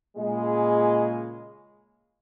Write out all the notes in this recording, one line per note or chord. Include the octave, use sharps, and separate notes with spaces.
A#2 C#3 G#3